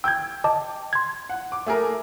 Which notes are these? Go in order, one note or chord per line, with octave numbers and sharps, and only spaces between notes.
G5 E6 G6 G#6
D#5 A5 D6
C6 G#6
F#5
D6
A3 G#4 A#4